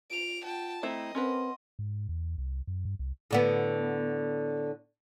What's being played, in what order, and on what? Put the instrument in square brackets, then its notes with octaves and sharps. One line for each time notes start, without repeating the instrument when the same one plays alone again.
[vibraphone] F4 [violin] D7 F7
[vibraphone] F4 F#5 [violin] G5 A5
[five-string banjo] A3 C4 E4 [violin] D#5 [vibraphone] G5 A#5
[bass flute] C4 [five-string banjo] C#4 A#4 B4 [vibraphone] F#5 C6
[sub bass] G#2
E2
C2
F#2
G2
C2
[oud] A2 D3 B3